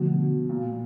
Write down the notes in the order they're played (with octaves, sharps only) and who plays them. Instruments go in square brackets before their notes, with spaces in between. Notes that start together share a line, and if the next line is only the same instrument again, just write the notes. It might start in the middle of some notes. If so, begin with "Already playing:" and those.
Already playing: [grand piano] B2 [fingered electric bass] D3 F3 A3
[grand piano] A#2